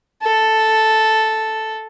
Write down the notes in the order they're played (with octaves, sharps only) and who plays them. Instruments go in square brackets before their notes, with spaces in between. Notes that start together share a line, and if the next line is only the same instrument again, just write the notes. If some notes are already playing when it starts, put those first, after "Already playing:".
[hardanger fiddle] A4